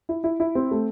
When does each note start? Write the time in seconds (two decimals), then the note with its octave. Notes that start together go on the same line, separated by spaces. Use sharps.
0.09 E4
0.24 E4
0.40 E4
0.55 C4
0.71 A3